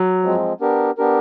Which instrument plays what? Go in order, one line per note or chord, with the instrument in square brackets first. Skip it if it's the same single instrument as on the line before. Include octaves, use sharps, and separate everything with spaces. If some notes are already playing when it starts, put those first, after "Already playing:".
Already playing: [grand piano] F#3
[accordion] F3 G#3 C4
B3 D4 G4 A#4
B3 D4 G4 A#4